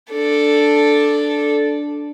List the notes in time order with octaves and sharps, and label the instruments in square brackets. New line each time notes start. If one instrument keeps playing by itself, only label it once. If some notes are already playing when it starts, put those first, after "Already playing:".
[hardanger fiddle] D4 A4